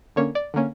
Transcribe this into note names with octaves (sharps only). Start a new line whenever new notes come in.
D3 A#3 C#4 C#5
D5
D3 A#3 C#4